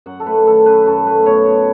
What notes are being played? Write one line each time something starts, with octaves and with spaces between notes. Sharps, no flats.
F#2 F#5
A4
A3 B4
D#3 A4
F#2 B4
F#2 A4
A3 B4
B2 C#5
B2